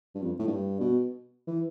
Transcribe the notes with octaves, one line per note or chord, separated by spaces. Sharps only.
G2
F2
A2
G2
B2
E3